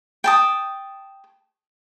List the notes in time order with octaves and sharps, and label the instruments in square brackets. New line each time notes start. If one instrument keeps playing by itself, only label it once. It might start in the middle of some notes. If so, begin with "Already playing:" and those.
[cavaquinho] G5 A5 D#6